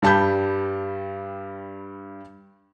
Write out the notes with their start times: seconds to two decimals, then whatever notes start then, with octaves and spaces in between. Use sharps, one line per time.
0.02 G2 G3 A5 B5 G6